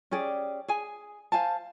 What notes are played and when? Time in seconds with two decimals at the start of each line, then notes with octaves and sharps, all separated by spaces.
0.11 C#4 G4 G#4 D5
0.68 G#4 G#5
1.32 C5 F5 G#5 A5